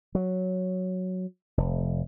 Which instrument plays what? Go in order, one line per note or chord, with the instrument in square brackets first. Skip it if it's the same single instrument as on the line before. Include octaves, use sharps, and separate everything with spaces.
[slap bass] F#3
F1